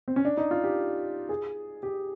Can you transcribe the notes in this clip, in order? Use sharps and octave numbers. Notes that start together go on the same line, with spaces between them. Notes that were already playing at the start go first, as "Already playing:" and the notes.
C4
C#4
D4
D#4
F4
G4
G#4
G4